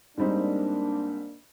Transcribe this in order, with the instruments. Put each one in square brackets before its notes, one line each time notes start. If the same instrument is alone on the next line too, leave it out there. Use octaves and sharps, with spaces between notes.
[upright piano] G#2 G3 C4 D#4 [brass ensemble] A#3 D4